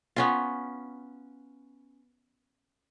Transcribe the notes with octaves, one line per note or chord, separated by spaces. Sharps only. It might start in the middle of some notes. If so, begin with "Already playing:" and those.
B3 C#4 F4